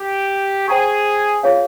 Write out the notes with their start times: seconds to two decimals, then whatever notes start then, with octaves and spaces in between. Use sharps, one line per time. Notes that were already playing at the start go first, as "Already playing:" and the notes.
Already playing: G4
0.68 G#4 C5 G5 A#5 C#6
1.43 F4 G#4 C#5 F5